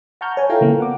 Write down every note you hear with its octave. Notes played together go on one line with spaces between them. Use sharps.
F#5 A5 A#5 C#6 F6 G6
C#5 G#5
E4 F4 A4 F5 G5 A#5
C#3 A#3 B3
F#5 D6